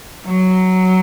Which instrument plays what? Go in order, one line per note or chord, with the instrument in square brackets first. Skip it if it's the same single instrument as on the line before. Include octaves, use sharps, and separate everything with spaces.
[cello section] F#3